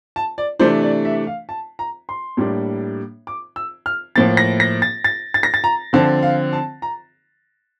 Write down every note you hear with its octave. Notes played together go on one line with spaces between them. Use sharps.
A5
D5
C3 E3 A3 D4 C5
D5
E5
F5
A5
A#5
C6
A2 G3 A#3 D4
D6
E6
F6
A2 F3 A#3 A6
A#6
A#6
A6
A6
A6
A#6
A6
A#5
D3 F3 C4 A5
F5
A5
A#5